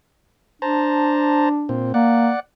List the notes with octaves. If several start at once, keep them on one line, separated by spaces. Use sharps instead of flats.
D4 C5 A5 A#5
A#2 C4
A#3 D5 F#5